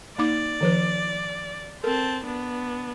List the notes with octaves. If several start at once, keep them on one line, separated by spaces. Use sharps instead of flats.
A#3 D#4 D5 D6
D#3 F3 B4
C4 A4 A#4 A5
B3 D4